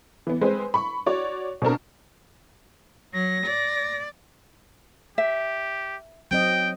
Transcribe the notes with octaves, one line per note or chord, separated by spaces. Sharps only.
E3 B3
G#3 C4 B4 C5
B5 C#6
F#4 C#5 D5
B2 C4 D4 A#4
F#3 A#6
D5
G4 E5
F#3 C4 D#5 G5